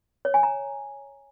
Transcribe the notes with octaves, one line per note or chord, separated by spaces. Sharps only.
C#5
G#5
A#5